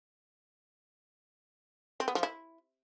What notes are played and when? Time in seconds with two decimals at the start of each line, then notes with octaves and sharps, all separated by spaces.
2.00 C4
2.08 B3
2.15 F3
2.23 E4